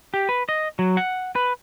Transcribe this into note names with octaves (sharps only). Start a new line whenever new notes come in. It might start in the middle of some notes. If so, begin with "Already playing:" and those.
G4
B4
D#5
F#3
F#5
B4